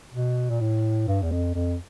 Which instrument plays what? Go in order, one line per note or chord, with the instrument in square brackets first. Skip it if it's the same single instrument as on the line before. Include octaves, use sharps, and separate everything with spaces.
[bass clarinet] B2
A#2
A2
G2
E2
F2
F2